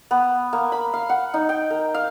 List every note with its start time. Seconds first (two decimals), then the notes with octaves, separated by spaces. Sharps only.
0.11 B3
0.53 A#3
0.72 B5
0.94 F5
1.09 F#5
1.34 D#4
1.49 G5
1.70 A#4
1.94 F5